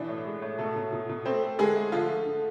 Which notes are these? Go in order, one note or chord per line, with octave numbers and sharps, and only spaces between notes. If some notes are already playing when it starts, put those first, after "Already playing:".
Already playing: B2 E3 D4
A2
G#3
A2
B2 A3 A4
B2
B2
B2
A3 C4 C5
A3
D3 G#3 G#4
A3
D3 F3 F4
A3
D3